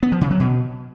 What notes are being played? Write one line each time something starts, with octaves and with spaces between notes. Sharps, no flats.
B3
F3
C#3
F#3
B2